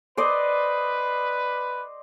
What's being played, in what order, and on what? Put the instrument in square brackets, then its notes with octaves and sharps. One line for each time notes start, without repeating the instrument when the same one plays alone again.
[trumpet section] B4 [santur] C5 D5 D#5